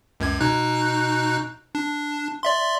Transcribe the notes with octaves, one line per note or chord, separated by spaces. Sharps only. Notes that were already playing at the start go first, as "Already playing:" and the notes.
C#2 F#2 G#6
B2 D#4 F#6
D4
D5 E5 C6